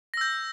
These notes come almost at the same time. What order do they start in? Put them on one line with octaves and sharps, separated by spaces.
A#6 E6 G6